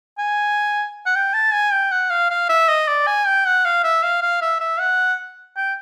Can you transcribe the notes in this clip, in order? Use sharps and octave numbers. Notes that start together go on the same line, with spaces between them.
G#5
F#5
G5
A5
G#5
G5
F#5
F5
F5
E5
D#5
D5
G#5
G5
F#5
F5
E5
F5
F5
E5
E5
F#5
G5